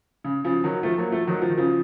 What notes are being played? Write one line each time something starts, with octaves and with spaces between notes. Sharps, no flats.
C#3
C#3 F3
D#3 F#3
F3 A3
F#3 A#3
F3 A3
D#3 F#3
F3
D#3
C#3 F3